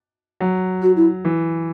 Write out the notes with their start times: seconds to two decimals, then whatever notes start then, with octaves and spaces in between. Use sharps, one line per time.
0.41 F#3
0.82 F#4
0.96 E4
1.25 E3